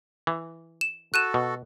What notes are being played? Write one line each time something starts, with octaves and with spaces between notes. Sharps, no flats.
E3
E7
F#4 A4 F#6 D#7 E7
B2